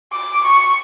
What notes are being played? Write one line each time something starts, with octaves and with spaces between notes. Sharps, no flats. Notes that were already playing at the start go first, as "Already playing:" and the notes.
D6
C#6